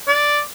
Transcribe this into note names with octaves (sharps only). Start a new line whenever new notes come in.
D5